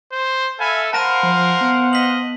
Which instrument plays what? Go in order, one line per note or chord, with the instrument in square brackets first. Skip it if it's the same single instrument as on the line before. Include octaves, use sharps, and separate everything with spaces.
[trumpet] C5
[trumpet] A4 [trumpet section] E5 F5 G#5 [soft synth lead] B5
[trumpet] A#4 [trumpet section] C5 F5 F#5 [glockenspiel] A5 A#6 D#7
[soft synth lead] F3
B3
[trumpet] D#5 [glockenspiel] B6 F#7